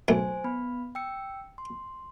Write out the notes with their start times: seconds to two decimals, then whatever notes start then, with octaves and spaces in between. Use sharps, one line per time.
0.08 B1 A3 C5 G#5
0.44 B3 B5
0.95 G5 E6 C#7
1.58 C6